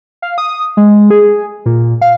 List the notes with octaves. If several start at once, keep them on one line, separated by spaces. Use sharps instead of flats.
F5
D#6
G#3
G#4
A#2
F5